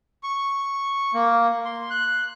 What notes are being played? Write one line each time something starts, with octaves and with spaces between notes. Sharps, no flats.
C#6
A#3
C6
F#6